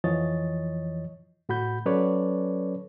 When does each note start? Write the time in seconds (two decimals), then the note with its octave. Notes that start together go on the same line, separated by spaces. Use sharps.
0.04 F2 E3 F3 C#5 D#5 A6
1.49 A2 F#4 B5 G6
1.86 F#3 C#4 A4 B4 C#5 D5